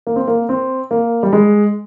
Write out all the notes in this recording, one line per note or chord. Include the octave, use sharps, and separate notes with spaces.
A#3
C4
A#3
C4
A#3
G3
G#3